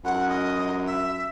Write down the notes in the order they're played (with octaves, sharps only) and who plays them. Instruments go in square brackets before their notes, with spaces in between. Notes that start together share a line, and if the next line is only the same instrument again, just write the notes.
[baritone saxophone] F#2 [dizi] F#5
[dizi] D#5
E5